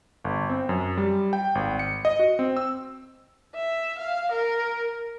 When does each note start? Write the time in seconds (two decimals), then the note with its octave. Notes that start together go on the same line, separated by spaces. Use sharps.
0.25 G1
0.49 C4
0.69 F#2
0.97 G3
1.33 G5
1.55 G#1
1.79 C#7
2.05 D#5
2.19 F#4
2.39 C4
2.57 E6
3.55 E5
3.98 F5
4.31 A#4